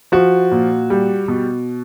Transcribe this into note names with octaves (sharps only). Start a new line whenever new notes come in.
F3 F#4
A#2
G3
B2